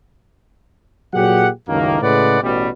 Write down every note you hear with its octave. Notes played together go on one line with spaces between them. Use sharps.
A#2 F#3 G4 G#4 F#5
C#2 F#2 A2 D#3 A#3
A2 C#3 G#3 B4 D5 F#5
A1 B2 G3